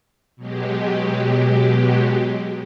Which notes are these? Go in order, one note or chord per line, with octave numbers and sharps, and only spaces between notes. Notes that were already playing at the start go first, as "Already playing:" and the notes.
B2 F#3 G#3 G4